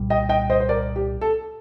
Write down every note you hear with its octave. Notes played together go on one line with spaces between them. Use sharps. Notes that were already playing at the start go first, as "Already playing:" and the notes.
Already playing: C2 A#2 G3
D#5 G5
D#5 G5
C5 D#5
C5
A#4 D5
G4
A4